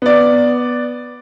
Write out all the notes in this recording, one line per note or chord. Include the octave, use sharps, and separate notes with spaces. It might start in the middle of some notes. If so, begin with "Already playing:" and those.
B3 D5